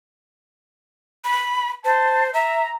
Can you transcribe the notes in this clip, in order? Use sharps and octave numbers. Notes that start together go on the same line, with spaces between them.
B5
C5 A5
E5 A#5